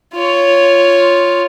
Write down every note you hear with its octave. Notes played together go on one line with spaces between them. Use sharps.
F4 C#5